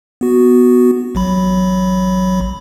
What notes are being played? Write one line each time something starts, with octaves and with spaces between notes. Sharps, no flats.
B3 F#4
A1 F#3 B5